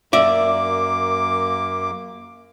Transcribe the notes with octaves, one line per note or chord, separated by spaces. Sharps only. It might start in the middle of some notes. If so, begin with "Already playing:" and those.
F#2 A#3 D5 E5 D6